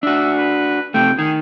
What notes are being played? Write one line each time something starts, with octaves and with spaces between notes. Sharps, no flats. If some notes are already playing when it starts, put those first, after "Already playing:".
D4 F#4 E5
B4
C3 A3 G5
D#3 G#4